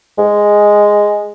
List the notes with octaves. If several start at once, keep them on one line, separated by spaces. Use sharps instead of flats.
G#3